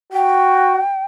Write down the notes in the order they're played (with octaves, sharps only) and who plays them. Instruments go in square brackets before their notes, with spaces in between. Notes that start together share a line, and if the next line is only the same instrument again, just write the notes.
[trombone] F#4 [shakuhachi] G5